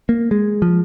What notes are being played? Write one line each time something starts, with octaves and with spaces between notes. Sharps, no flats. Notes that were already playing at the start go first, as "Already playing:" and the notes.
A#3
G#3
F3